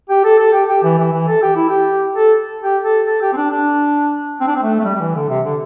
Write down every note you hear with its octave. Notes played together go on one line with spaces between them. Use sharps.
G4
A4
A4
G4
G4
E3
E3
E3
A4
G4
E4
G4
A4
G4
A4
A4
G4
C4
D4
D4
C4
D4
C4
A3
A3
G3
G3
E3
D3
C3
D3